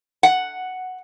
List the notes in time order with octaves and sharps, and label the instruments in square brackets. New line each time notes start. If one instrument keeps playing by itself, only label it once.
[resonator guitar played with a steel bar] F#5